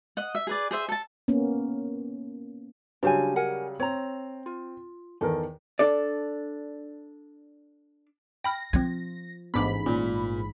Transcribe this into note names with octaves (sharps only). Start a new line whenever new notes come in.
D#5 F#5
E5
G#4 B4 D5
G#4 C5 E5
A4 A5
A#3 B3 C#4
C#3 F#3 G3 D4 C5 G#5
A#4 F#5 G#5
C4 C#5 A#5
F4
E2 D#3 A4 A#4
D4 A4 D5
G5 B5 F6 A#6
F3 C4 F4 G#6
A1 G#2 B3 D4 B5 D6
A#2 C#4